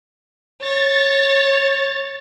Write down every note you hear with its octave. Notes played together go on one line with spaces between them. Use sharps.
C#5 A6